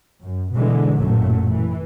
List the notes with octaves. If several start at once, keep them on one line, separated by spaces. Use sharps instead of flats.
F#2
B2 D3 E3 G#3
A1 F#2 A#2 F#3 A3
E3